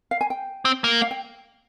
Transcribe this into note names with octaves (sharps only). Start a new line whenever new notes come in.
F5
G#5
G5
C4
A#3
F5
G5